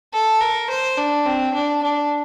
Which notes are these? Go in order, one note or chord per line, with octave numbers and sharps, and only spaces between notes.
A4
A#4
C5
D4
C4
D4
D4